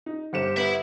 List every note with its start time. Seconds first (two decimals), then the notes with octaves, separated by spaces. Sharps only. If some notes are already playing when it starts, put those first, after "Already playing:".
0.06 D#4
0.33 G1 C4 G4 C#7 E7
0.57 B3 E5 B5